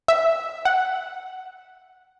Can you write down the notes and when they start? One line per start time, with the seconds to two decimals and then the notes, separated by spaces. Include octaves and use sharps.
0.08 E5
0.65 F#5